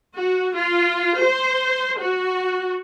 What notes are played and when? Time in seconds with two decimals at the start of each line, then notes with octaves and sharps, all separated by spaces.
0.16 F#4
0.55 F4
1.19 C5
1.99 F#4